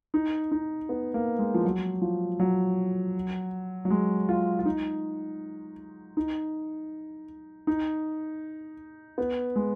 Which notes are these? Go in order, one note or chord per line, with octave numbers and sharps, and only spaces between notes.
D#4
D#4
B3
A#3
G#3
F3
F#3
F3
F#3
F#3
G#3
F4
F4
D#4
D#4
D#4
B3
G#3